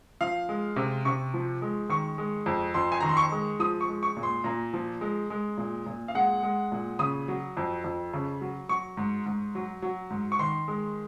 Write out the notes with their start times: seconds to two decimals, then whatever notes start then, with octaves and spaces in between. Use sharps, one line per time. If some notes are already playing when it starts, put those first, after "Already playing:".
0.21 F3 F5
0.49 G#3
0.76 C3
1.05 C3 C#6
1.34 F3
1.62 G#3
1.89 D#3 C#6
2.18 G#3
2.46 F2
2.74 F2 C6
2.92 G#5
3.00 D#3 A#5
3.09 C6
3.17 C#6
3.32 G#3
3.60 F3 D#6
3.81 C#6
3.88 G#3
4.03 C#6
4.17 A#2
4.23 C6
4.44 A#2 A#5
4.74 F3
5.01 G#3
5.30 G#3
5.58 A#2
5.86 A#2
6.08 F5
6.15 G#3 F#5
6.43 G#3
6.72 A#2
6.99 C#3 D#6
7.28 F#3
7.57 F2
7.84 F2
8.13 C#3
8.41 F#3
8.69 F#3 C#6
8.97 G#2
9.26 G#2
9.55 F#3
9.82 F#3
10.10 G#2
10.32 C#6
10.39 D#3 C6
10.68 G#3